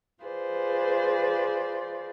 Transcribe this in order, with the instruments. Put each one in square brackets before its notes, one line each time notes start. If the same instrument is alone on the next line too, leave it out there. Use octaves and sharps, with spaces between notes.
[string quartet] F4 G#4 B4 C5 D5